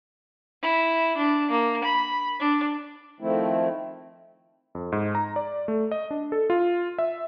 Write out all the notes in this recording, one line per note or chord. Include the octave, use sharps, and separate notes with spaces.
E4
D4
A#3
B5
D4
D#3 F3 A3 C4 E4
F2
G#2
A#5
D5
A3
D#5
D4
A4
F4
E5